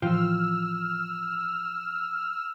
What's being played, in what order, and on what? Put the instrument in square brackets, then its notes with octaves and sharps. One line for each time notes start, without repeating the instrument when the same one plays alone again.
[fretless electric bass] A2 E3 F3 [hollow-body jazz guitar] F4 G5 [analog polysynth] E6 F6